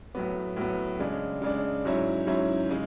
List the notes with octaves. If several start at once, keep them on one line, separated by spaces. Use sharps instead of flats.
A2 F#3 B3
A2 F#3 B3
C#3 G#3 D4
C#3 G#3 D4
G#2 F#3 C#4 E4
G#2 F#3 C#4 E4
C#3 G#3